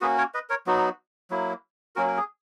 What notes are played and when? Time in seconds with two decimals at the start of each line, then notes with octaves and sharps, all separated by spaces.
0.01 A#3 C#4 F#4 G#4 B4
0.18 A#4 C#5
0.34 B4 D#5
0.50 A#4 C#5
0.67 F#3 B3 D#4 F#4
1.30 F#3 A#3 E4
1.96 F#3 A#3 C#4 F#4 A#4
2.08 A#4
2.17 G#4